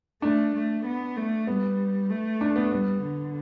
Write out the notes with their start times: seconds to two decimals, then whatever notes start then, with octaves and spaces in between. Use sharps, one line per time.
0.22 A3 D4
0.54 A3
0.85 B3
1.16 A3
1.47 G3 B3
2.10 A3
2.41 D4
2.56 B3
2.72 G3 B3
3.03 D3